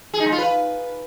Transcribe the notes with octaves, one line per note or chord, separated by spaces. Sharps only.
G#4
D#4
G#3
F4
B4